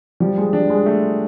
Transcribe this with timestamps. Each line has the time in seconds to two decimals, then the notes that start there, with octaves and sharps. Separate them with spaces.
0.20 F3 G3
0.38 G#3
0.53 G3 D4
0.70 G#3
0.86 A3